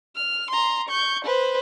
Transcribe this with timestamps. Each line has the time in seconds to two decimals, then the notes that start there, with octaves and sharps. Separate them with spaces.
0.16 F6
0.50 A#5 C6
0.89 C#6 G6
1.24 B4 C5